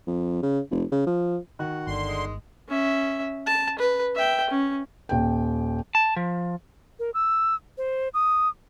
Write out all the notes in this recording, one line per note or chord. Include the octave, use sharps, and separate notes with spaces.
F2
C#3
F1
C#3
F3
D#3 F#4
G1 D3 C6
G#3
C#4 E5
A5
B4
E5 G5
C#4
D#1 G5
A5
F3
A#4
E6
C5
D#6